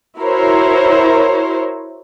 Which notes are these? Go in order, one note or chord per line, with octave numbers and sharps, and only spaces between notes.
E4 F#4 A#4 C5 C#5